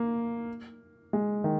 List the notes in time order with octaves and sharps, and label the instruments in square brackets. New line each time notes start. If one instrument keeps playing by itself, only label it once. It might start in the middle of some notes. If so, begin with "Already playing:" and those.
Already playing: [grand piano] A#3
G#3
D#3